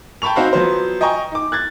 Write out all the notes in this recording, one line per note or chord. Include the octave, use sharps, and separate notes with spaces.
G5 A5 B5 C#6 F7
C4 D#4 F#4 F5 B5
F3 F#3 B3 C5
D#5 G5 G#5 A#5 C#6 D#6
D#4 D6
F#6 G#6 A6